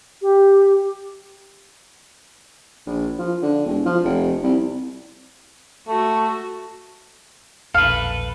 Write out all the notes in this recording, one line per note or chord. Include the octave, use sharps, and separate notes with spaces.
G4
A#1
F3
D3
E1
F3
F1
C2
A3 F#4
E1 A#1 A4 B4 F5